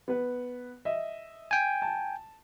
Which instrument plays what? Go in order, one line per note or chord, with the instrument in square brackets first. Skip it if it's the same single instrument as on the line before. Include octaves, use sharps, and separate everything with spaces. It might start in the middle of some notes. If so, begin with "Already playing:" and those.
[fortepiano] B3 B4
D#5 E5
[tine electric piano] G5 G#5
[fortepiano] A5